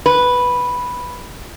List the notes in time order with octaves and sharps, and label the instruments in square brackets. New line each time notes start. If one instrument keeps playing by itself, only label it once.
[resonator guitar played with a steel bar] B4